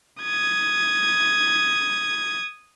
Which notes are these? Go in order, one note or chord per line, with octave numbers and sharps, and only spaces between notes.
D#6 G#6